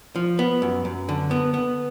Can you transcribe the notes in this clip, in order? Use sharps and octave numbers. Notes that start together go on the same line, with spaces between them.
F3
B3
F#2
F#2
D3
B3
B3